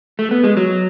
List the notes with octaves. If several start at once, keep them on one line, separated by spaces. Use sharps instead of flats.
A3
B3
G#3
F#3